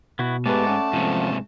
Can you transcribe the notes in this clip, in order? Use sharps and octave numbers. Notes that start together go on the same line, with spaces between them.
B2 B3 E4 F#4
G#2 A3 B3 G4 B4 D5 A5
C#4 F#5
G#2 C3 F3